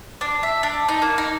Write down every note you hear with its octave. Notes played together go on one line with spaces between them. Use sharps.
D4
E5
D4
D#4
A#3
D#4